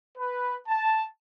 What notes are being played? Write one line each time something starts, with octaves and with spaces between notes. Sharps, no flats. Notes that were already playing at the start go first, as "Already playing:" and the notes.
B4
A5